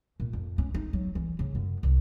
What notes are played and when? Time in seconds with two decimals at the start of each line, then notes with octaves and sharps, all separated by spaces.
0.20 A#2
0.33 F2
0.58 C#4
0.74 D#4
0.93 F#3
1.15 E3
1.39 C#3
1.55 F#2
1.83 C2